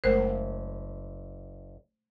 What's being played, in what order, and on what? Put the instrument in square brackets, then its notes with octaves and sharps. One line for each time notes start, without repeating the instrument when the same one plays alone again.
[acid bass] F#1 [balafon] G#3 A3 A#4 [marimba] C5